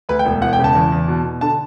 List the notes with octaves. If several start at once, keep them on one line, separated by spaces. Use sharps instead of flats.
D2 B4
G5
E1
E1 F#5
G5
C#3
A5
E2
E2
B2
B2
D3 A5